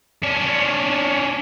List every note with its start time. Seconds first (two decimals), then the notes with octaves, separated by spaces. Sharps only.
0.23 C#4 D4